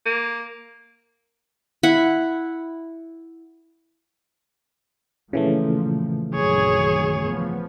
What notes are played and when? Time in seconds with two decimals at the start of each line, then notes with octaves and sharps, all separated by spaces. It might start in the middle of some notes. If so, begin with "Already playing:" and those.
0.06 A#3
1.83 E4 F#5 B5
5.33 A#2 C#3 E3 F3 A3
6.34 A#1 F#2 D#3 G#4 C#5
7.25 F3 B3